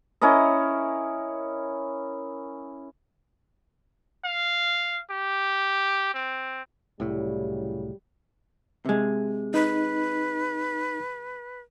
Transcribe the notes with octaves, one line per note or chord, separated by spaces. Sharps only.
C#4 E4 A#4 D#5
F5
G4
C4
C2 A2 C#3 F#3 G3
C3 G#3
D#4 B4